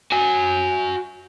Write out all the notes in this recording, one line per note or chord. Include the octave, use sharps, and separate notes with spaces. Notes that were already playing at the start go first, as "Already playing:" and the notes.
F#4 G#5